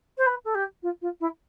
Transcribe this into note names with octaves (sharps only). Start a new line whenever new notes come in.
C5
B4
A4
G4
F4
F4
E4